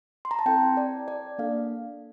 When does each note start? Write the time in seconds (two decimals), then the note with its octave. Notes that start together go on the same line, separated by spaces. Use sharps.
0.25 C6
0.31 A#5
0.39 A5
0.46 C4 E4 A4 G5
0.77 D5
1.08 D5
1.38 A#3 D4 A4 F5